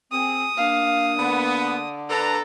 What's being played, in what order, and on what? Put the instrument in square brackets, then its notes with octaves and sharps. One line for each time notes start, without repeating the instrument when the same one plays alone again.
[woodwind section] C4 [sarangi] G#4 [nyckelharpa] D#6
[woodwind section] A#3 D4 [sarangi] F5
[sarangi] D3 [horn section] B3
[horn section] D4 B4 A#5 [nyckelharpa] A4